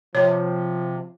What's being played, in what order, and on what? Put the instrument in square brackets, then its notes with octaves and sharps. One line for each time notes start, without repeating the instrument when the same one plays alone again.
[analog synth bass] C3 [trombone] F3 [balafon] C#5